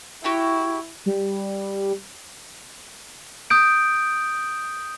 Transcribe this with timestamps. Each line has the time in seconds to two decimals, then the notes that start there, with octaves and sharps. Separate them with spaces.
0.24 E4 F#4 G4 G5
1.06 G3
3.50 D#6 G6 D7